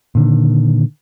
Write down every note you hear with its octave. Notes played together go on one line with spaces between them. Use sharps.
A#2 D3 D#3